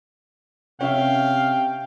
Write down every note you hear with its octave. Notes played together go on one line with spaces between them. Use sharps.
C3 C#4 E5 F5 G5